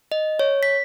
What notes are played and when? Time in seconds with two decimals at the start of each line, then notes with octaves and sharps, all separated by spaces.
0.12 D#5
0.39 C#5
0.63 B6